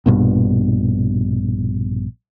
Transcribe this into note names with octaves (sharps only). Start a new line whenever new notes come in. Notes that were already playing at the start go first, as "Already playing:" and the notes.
A#1 G2 B2